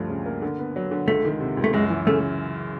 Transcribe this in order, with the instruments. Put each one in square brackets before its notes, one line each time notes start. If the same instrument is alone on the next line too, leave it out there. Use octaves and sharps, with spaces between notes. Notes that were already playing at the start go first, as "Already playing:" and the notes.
Already playing: [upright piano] D2 G2 F3
C#3
A#3
D3
B3
F#3
D3
[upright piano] C#2 [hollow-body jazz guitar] A3
[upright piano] D#3
C3
C#2
[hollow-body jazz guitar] A3
[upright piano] F#2 [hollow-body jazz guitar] G#3
[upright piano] E3
[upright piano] C#3 [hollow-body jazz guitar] A3